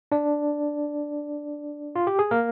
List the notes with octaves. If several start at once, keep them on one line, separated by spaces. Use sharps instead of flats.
D4 D5
F4
G4
G#4
A#3 A#4